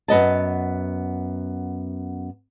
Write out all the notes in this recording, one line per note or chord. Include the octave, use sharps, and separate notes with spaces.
F#2 B3 D#5 A5